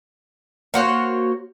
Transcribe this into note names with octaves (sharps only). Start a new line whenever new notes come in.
A#3 F#4 C5 C#5